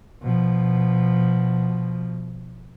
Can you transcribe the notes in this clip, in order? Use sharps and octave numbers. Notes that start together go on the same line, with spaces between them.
B2 F3